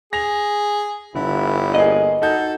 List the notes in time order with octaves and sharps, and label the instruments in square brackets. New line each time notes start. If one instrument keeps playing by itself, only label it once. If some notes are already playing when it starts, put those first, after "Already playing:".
[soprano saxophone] G#4 [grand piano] A#6 F7
[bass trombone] G1 [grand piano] D3 [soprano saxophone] E4
[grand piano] A#3 G#4 [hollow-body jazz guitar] D#5
[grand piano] D#4 F#4 G6 [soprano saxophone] A4